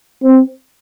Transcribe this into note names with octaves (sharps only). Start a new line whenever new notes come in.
C4